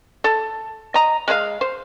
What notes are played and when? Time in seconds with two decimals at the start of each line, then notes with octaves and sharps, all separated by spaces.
0.24 A4
0.94 D#5 A#5
1.28 G#3 G#4 B4 F5
1.61 C5